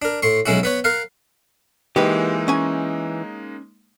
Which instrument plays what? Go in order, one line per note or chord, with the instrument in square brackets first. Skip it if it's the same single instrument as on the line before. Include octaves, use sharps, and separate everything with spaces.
[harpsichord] D4 A#4
A2 C6 C#6
B1 G#3 C#4 E4 F#4
B3 B4 C#5
A#4 F5 F#5
[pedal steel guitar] E3 [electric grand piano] G#3 A#3 D#4 [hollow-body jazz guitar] G4 B4
[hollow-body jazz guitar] C#4 G#5